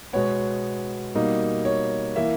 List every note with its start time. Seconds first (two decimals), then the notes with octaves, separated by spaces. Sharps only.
0.13 B2 G#3 B3 C#5
1.15 B2 G3 A#3 D#4
1.65 C#5
2.16 E3 A#3 E5